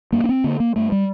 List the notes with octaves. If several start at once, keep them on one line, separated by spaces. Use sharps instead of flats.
G2 A#3
D4
C4
D3 A#3
A#3
G2 A3
G3